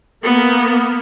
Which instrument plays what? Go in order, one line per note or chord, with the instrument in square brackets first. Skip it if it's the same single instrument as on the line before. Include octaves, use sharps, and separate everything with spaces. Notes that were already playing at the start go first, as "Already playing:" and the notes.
[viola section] A#3 [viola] B3